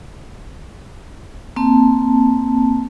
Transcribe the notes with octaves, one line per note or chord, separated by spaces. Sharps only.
A#3 C4 A5